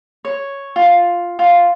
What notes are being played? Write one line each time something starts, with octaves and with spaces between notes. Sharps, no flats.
C#5
F4
F4